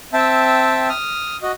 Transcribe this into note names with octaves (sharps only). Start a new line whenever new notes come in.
C4 E5 G5 A5
D#6 F6
F#4 D#5